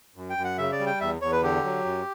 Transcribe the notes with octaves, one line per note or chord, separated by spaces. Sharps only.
F#2
G5
F#2
F#5
C#3 E5
D5
G3
G5
E2 E5
E2 C#5
B4
D3 G4
F#3
F#2